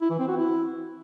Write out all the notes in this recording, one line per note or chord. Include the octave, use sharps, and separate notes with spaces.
E4
E3
C4
F#4
E4